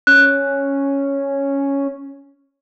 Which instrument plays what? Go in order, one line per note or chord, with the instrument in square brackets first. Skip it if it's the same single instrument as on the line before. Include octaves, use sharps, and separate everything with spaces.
[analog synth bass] C#4 [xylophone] F#6